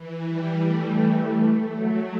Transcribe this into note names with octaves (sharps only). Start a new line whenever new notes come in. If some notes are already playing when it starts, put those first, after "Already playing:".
Already playing: E3
G3
A3
A3
F#3